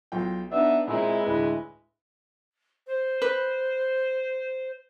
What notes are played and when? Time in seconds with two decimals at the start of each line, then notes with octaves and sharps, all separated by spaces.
0.12 B1 F4 G5
0.52 B3 D4 D#4 E5
0.87 A#2 G#3 C4 E4
1.23 D2 A2 B4
2.87 C5
3.22 B4